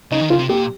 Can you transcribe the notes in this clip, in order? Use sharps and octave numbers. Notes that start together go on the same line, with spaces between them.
C#3 D#4
D#3
C#3 F4
C3
A#2 G4